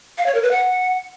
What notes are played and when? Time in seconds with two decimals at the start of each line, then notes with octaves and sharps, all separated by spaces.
0.18 F5
0.26 C#5
0.35 A#4
0.43 B4
0.51 F#5